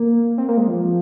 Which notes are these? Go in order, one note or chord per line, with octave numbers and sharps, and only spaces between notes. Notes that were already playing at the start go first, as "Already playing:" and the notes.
Already playing: A#3
C4
A#3
G#3
F3